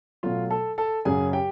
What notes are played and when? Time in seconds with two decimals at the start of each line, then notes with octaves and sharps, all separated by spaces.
0.23 B2 F#3 A3 F4 F5
0.50 A4 A5
0.78 A4 A5
1.05 F#2 C#3 F#3 G#4 G#5
1.33 G4 G5